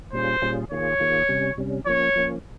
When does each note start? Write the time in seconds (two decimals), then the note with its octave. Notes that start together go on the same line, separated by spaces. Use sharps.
0.13 A#2 G3 C#4 F4 G#4 C5
0.42 A#2 G3 C#4 F4 G#4
0.71 D#3 A#3 F4 G#4 C#5
1.00 D#3 A#3 F4 G#4
1.29 C3 G3 C#4
1.58 C3 G3 C#4
1.86 F3 A#3 C#4 C#5
2.16 F3 A#3 C#4